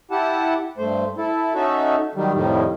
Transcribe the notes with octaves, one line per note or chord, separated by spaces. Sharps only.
E4 G4 F#5 A5
G2 A3 C5
E4 A4
C#4 D#4 F#4 A4 E5
D#3 F#3 G3
F2 A2 D#3 G3